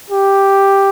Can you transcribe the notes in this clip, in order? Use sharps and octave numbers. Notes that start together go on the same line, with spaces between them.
G4